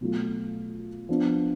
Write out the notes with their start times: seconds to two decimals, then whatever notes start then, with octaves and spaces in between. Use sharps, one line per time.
0.01 B2 F#3 A3 F4
1.09 F3 B3 D4